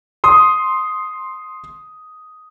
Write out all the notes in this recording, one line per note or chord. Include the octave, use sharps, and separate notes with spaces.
C6 D#6